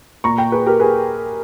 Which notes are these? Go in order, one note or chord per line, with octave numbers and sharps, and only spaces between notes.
A#2 A#5 C#6
G5 A#5
G#4 B4
G4 A#4
G#4 B4